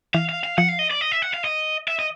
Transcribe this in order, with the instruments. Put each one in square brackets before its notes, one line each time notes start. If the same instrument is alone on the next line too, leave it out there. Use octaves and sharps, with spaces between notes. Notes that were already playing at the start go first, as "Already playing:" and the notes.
[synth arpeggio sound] E3 [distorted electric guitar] F5
[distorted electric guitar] F5
F5
[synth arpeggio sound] F3 [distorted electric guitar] F#5
[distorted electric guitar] F5
D#5
D5
D#5
E5
F#5
F5
D#5
E5
D#5